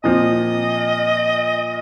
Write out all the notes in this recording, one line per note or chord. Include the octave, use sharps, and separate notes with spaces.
A#2 F3 C4 D#5